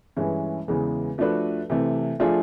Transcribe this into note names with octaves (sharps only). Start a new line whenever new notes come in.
G2 E3 G#3 C#4 E4
E2 C#3 E3 G#3
F3 A3 D4 F#4 B4
C3 E3 A3
F3 A3 D4 F4 G#4